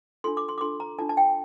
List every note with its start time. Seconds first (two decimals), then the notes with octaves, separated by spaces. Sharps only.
0.24 D4 F4 A4 C6
0.37 D6
0.49 C6
0.58 D6
0.61 D4 F4 A4 C6
0.80 A#5
0.99 D4 F4 A4 A5
1.09 A5
1.17 G5